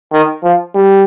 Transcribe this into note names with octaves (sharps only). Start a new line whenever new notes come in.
D#3
F3
G3